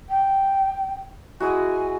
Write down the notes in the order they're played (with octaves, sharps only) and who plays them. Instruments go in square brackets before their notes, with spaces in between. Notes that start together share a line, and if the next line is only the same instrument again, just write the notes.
[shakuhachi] G5
[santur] G#3 E4 F#4 [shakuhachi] G#5